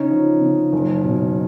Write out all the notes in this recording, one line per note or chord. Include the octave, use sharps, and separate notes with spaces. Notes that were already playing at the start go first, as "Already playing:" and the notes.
Already playing: C#3 C#4 D#4
F3
C#3
F#1
B2